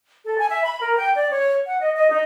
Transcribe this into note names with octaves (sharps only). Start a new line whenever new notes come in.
A4
G#5
E5
B5
A#4
G5
D5
C#5
F#5
D#5
D#5
D#4